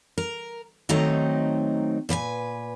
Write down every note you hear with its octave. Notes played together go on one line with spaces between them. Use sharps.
A#4
D#3 F#3 A3 C4 D#4 A#5
A#2 B4 D5 G#5